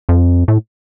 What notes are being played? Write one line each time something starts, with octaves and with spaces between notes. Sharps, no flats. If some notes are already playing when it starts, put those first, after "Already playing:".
F2
A2